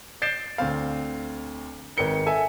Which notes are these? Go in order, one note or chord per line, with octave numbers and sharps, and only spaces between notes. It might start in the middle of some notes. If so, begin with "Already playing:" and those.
G6 A6 C7 D7 E7 G7
D2 C4 F5
G#1 A#4 B4 C#7 G7
A4 E5 G#5